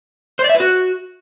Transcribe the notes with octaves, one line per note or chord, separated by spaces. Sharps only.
C5
D5
E5
B4
F#4